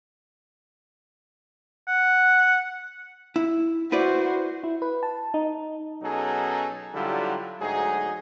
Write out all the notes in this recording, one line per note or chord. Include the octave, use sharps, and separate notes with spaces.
F#5
E4
E4 F#4 B4 C5 D5
E4
B4
A5
D#4
B2 F#3 C#4 D#4 G#4 A4
D3 F#3 G3 E4 F4 G4
D2 G#2 F#3 D#4 G#4